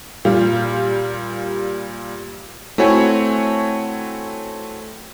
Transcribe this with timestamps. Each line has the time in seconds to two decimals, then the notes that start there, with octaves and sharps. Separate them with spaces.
0.25 A#2 G3 F4
2.78 A3 C4 E4 F#4 C#5 G#5